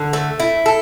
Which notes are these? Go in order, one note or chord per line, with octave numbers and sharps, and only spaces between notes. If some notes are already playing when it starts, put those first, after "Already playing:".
Already playing: D3
A3
E4
A4